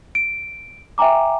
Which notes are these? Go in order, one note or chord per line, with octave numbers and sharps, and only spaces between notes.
D7
E5 G5 G#5 A#5 D6